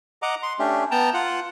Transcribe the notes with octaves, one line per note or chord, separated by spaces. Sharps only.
D#5 F#5 A#5 D6
C6
A3 C#4 D4 G4
B3 G5 A5 A#5
F4 F#5